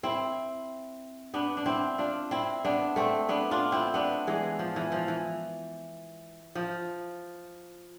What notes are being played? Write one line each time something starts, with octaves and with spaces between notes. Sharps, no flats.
C4 E4
B3 D4
D4
C4 E4
D4 F4
C4 E4
B3 D4
A3 C4
B3 D4
D4 F4
C4 E4
B3 D4
E3 G#3
F3
E3
F3
E3
F3